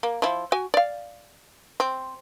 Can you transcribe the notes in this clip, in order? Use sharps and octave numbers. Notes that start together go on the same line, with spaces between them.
A#3
F3 E4
F#4 G#5
D5 F5
C4